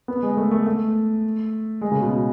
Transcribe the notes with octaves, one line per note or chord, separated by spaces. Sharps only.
B3
G#3
A3
A3
A3
G#3
C#3
B2